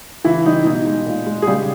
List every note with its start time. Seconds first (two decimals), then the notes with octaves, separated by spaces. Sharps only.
0.25 C#3 E3 E4
0.46 G3 D#4
0.65 B2 D#4
0.86 G#3
1.06 A#2
1.26 G#3
1.42 G#4
1.47 C#3 G3 G4